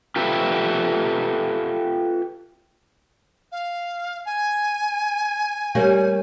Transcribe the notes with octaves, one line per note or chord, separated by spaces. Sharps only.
F4 G4 A4 B4 E5
F5
G#5
G3 A#3 C#4